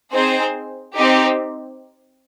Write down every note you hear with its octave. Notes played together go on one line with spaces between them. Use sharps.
C4 D#4 G#4 C5
C4 D#4 G4